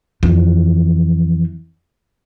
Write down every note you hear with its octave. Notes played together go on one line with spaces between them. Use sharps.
F2 E3